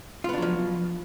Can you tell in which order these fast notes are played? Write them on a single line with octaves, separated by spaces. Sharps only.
F4 B3 D4 F#3 F3